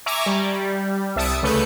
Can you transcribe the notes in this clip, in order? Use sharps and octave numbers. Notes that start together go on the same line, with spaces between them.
E5 G#5 A#5 C#6 D6
G3
C2 E5 A5 D#6 C#7 D7
D2 C#3 A3 B4 G6 C#7